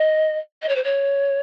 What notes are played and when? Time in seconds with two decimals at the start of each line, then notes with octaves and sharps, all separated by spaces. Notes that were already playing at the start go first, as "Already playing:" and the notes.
Already playing: D#5
0.62 D#5
0.68 C#5
0.75 C5
0.84 C#5